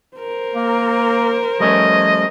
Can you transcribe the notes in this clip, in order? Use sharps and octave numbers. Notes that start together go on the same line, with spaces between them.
A#4 C5
A#3
F3 G3 A3 C#4 D#5